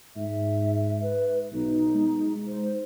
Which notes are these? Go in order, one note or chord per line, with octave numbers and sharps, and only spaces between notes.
G#2 E5
B4
B1 D#4
G#3
C5